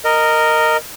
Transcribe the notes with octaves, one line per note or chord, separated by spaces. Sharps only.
A#4 D#5